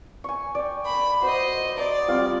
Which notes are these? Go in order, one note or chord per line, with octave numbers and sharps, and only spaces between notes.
G#5 C#6
D5 G5
B5
F#4 C5 D#5
D5 A#5 C6 D#6
G3 C4 F4